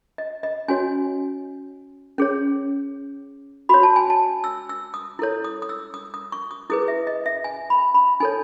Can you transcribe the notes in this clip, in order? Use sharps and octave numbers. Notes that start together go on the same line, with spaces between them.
D#5
D#5
C#4 F#4 C#5 G#5
C#4 G#4 C#5
F#4 C#5 B5
A5
G#5
A5
E6
E6
D#6
E4 A4 C#5
D#6
D#6
E6
D#6
D#6
C#6
D#6
E4 G#4 B4 D#6
E5
D#5
E5
G#5
B5
B5
D#4 A4 C#5 G#5